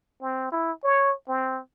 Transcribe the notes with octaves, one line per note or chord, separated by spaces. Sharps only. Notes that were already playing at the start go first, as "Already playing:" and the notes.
C4
E4
C#5
C4